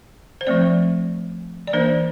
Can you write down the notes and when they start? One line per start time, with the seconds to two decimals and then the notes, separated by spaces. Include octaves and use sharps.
0.41 C5
0.47 F3 A3 C4 D5
1.67 D5
1.73 E3 A#3 D4 C5